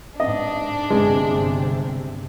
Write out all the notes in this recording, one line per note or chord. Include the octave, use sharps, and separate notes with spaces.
G#2 D4 D#5
G1 C3 G#3